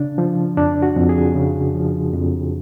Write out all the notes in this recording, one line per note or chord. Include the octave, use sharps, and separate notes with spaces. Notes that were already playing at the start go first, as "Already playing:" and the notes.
Already playing: C#3 D4
F3
F2 D4
F#4
F2
G#4
C#3
F3
F2